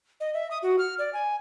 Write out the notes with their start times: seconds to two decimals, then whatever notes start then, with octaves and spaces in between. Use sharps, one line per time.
0.20 D#5
0.34 E5
0.51 D#6
0.63 F#4
0.79 F6
0.99 D5
1.13 G#5